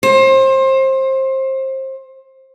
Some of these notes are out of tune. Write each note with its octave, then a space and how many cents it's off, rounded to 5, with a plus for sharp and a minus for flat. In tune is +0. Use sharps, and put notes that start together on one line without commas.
C5 +25